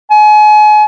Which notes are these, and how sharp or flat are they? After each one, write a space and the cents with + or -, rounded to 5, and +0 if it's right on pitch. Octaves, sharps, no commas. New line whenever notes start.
G#5 +35